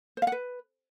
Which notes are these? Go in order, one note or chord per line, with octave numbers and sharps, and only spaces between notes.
C5
F5
F#5
B4